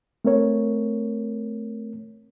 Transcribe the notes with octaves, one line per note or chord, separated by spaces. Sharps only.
A3 C4 A#4 C#5